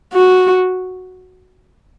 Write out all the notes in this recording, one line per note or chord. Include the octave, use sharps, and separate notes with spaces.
F#4